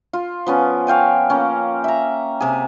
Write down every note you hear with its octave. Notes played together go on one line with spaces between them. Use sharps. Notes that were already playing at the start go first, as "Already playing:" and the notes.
F4
F3 B3 C#4
C#5 F5 G5 G#5
A#3 C#4
E5 A#5
C3 G#4